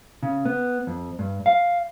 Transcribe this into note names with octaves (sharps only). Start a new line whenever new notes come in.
C#3
B3
F2
G2
F5